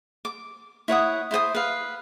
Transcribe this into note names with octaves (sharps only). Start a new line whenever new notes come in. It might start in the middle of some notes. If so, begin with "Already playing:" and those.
D6
E4 C#5 F#5 D#6
E4 C5 G5 D#6
B4 F5